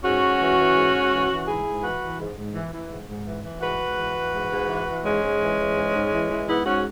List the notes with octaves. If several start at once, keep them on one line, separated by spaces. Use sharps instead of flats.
G#2 C#4 F#4
G#2
E3
E3
G#2
G#2
E3
E3
G#2 E4 G#4
G#2
E3 F#4 B4
E3
G#2
G#2
E3
E3
G#2
G#2
E3
E3
G#2 F#4 B4
G#2
E3
E3
G#2
G#2
E3
E3
G#2 G#3 C#4
G#2
E3
E3
G#2
G#2
E3
E3
G#2 B3 E4
G#2 C#4 F#4